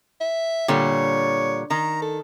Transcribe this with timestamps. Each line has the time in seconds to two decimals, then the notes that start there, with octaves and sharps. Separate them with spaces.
0.20 E5
0.68 A#2 D3 G3 C#5
1.70 D#3 A#5
2.01 A4